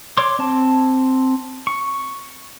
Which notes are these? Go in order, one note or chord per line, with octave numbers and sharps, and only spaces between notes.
C#5 D5 C6 D6
C4 A5
C#6